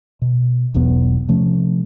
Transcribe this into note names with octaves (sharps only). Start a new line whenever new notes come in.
B2
E1 B1 E2 B3
C3 F3 A3 C#4